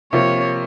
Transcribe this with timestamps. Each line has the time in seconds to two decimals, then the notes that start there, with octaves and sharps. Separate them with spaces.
0.12 C3 F3 A#3 F4 C#5